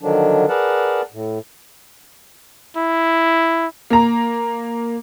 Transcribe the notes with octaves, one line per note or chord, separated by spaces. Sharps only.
D3 D#3 F3 F#3 D4
G#4 A#4 B4 D5 F#5 A5
A2
E4
A#3 A#5